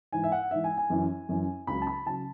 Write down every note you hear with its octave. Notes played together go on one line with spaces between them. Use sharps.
G#2 E3 G#5
E5
F#5
G#2 E3 E5
G#5
G#5
F#2 E3
F#2 E3
C#2 C#3 F#3 B5
A5
B5
C#3 F#3 A5